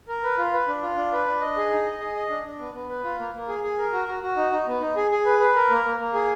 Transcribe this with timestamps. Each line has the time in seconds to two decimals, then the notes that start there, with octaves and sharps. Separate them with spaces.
0.08 A#4
0.23 B4
0.38 F4
0.53 B4
0.68 D4
0.82 F4
0.97 D4
1.12 B4
1.26 D4
1.41 D#5
1.56 G#4
1.71 D#4
1.85 D#5
2.00 G#4
2.15 D#5
2.29 D4
2.44 D4
2.59 B3
2.74 B3
2.89 B4
3.04 F4
3.19 A#3
3.34 A#3
3.48 G#4
3.63 G#4
3.78 A#4
3.93 F#4
4.08 F#4
4.22 F#4
4.37 D#4
4.52 D#4
4.67 B3
4.81 D#4
4.96 G#4
5.11 G#4
5.26 B4
5.40 B4
5.56 A#4
5.70 A#3
5.85 A#3
5.99 A#3
6.14 G#4